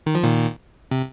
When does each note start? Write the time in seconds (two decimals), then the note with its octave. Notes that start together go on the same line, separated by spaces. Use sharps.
0.06 D#3
0.15 F3
0.23 A#2 D#3
0.91 C3